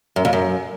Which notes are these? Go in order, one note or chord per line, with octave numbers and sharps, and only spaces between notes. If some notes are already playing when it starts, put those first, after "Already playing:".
F#2
F2
F#2